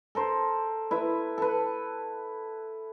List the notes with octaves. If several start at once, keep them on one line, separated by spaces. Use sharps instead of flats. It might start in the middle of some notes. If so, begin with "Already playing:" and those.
A4 A#4 C5
E4 B4 E5
A4 B4